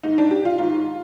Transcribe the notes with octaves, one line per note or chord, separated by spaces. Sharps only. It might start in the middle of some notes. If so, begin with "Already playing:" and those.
G#2 D#3 D#4
D4
G4
F4
G#2 D#3 F4